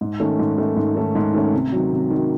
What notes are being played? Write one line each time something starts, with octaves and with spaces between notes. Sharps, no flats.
G#2
D#3 A3 C#4
G#2
D#3 A3 C#4
G#2
D#3 A3 C#4
G#2
D#3 A3 C#4
C3
D#3 F#3
C3
D#3 F#3